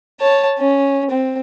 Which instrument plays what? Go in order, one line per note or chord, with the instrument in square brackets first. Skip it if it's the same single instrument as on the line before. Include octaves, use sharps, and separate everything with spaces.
[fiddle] C#5 A5
C#4
C4